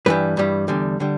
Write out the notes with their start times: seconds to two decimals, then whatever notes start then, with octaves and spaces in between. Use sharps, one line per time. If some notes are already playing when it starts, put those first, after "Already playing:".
0.06 G2 E3 G3 B4
0.37 G2 E3 G3
0.68 E2 D3 G3
1.00 D3 G3